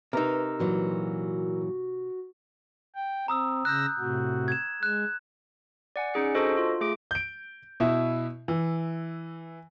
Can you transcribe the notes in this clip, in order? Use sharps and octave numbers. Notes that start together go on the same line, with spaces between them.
C3 D#4 A#4 B4 A#5 E6
A#2 E3 F#3 F#4
G5
C4 A#5 D#6 E6
C#3 E6 F#6 G6 A#6
A2 C3 F#4
G#6 E7
G#3 F#6 E7
D5 F#5 G#5
C#4 D#4 G#4 C#7
D4 F#4 A4 C5 D#5
F4
A3 G#4 D6 D7
G6 D7
B2 E4 E5
E3